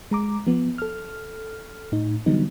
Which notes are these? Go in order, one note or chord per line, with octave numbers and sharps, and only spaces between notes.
G#3 A#5 D6
F3 B3
A4 F6
A2 D#4
D3 E3 F#3 G3 B3 D#4